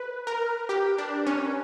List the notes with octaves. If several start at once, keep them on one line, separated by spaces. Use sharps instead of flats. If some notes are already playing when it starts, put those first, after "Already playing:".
Already playing: B4
A#4
G4
D4
C#4